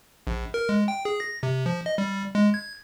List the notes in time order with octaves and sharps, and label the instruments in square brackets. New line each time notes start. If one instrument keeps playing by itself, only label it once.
[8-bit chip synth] A#1
A#4
G#3
G5
G#4
A#6
C3
F3
D#5
G3
G#3
G#6